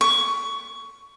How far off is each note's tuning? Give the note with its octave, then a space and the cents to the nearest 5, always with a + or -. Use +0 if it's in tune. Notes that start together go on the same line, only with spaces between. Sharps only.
C#6 +15